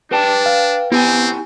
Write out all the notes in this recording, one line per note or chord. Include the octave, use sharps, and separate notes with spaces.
D4 B4 G5 A5
F5
B3 C4 E4 G4 G#5